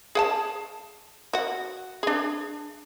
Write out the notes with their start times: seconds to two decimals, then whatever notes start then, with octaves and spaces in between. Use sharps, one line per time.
0.15 G#4 F#5 A5
1.33 F#4 F#5
2.03 D4 G#4